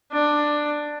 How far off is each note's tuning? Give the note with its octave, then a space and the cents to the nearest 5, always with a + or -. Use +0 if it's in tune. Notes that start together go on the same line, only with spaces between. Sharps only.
D4 +10